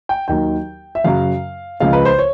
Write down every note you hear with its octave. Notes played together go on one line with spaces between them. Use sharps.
G5
D#2 D#3 F#3 G5
E5
F#2 C#3 F#3 F5
C#2 C#3 F3 G#3 F5
B4
C5
C#5